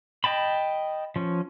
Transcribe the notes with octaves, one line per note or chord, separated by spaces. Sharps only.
D#5 G5 A5 B5
F3 C#4